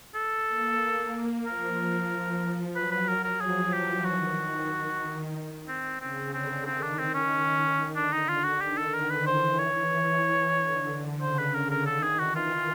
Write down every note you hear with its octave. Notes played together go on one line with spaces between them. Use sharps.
A4
A#3
F3 A#4
F3
F3
F#3 B4
B4
A#4
A#4
F3 G#4
E3 G4
D#3 F#4
C4
C#3 C4
D3 C4
D#3 C4
D4
C4
C#4
D3 D4
D#4
F4
F#4
D#3 G4
A4
A#4
B4
E3 C5
C#5
D3
C#3 C5
B4
D3 A#4
A#4
D#3 A4
G#4
E3 F#4
F4